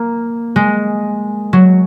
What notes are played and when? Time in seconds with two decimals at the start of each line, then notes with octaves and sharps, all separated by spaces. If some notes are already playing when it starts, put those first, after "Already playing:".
Already playing: A#3
0.56 G#3
1.53 F#3